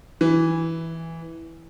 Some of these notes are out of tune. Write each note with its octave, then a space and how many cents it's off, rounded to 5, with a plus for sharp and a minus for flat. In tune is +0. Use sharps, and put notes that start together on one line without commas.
E3 -5